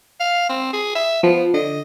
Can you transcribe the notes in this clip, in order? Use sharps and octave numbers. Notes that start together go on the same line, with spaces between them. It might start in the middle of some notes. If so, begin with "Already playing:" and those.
F5
C4
G#4
E5
F3 B3
D3 D#5